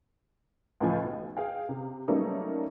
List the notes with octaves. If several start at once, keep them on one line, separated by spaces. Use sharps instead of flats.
C#2 A2 F3 G#5
B1
G#4 F5 G5
C3
F#3 G3 A3 A#3 C#4 D#4